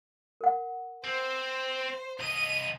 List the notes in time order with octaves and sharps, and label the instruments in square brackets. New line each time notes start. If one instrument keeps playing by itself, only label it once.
[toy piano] A#4 F#5
[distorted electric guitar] C4 [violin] C5
[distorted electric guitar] C2 D#5 [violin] D#7